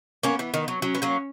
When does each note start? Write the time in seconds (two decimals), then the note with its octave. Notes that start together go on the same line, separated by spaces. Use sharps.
0.23 A#3 B3 C#4
0.39 E3
0.54 D#3
0.68 F#3
0.82 F#3 C#4
0.95 B3
1.02 F#3 A#3